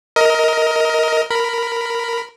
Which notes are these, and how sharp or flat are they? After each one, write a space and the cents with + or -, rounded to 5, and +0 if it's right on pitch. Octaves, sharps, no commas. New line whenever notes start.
A#4 +0 D#5 +25
A#4 +0 B5 +5